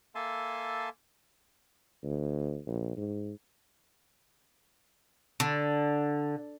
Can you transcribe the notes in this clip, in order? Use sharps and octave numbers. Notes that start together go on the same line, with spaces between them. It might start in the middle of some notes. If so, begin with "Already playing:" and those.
A#3 A4 E5 G#5 A5 C6
D2
A#1
G#2
D3